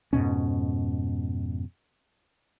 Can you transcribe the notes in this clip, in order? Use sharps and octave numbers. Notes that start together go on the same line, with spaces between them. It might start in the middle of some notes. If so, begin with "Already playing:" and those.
F2 G#2 B2 C#4